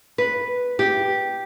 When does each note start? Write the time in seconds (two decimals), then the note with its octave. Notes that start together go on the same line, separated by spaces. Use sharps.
0.18 B4
0.79 G4